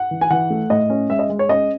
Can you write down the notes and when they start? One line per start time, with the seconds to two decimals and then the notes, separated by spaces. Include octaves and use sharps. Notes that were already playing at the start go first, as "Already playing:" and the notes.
Already playing: F#5
0.11 E3
0.21 G#5
0.31 E3 F#5
0.50 A3
0.70 A2 D#5
0.90 C#4
1.09 G#3 E5
1.19 D#5
1.30 G#3
1.39 C#5
1.49 C#4 D#5